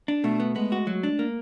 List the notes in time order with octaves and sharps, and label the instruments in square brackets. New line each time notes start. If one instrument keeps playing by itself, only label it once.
[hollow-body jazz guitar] D4
[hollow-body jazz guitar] B2 [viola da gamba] A3
[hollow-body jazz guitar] B3
[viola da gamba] G#3 [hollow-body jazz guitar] B3
[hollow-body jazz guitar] F#4
F#3
D4
A#3